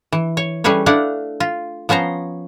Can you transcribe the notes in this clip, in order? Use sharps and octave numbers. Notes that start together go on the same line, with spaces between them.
E3
C#5
G3 A3 C#4 G#4 B4 C#5
A3 D4 E4 D5 F5 F#5
F4
F3 B3 C#4 C5 A#5